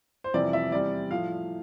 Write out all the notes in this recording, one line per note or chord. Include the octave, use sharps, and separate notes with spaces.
C5
F2 C3 E3 G3 D5
E5
E2 C3 G3 D5
A2 F3 F5